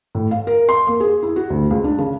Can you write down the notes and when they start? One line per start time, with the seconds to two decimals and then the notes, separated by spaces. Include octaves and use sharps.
0.15 A2
0.31 F5
0.47 A#4
0.69 C6
0.87 A#3
1.00 G#4
1.23 E4
1.36 F#4
1.50 D2
1.71 C#2
1.84 D4
1.98 C#3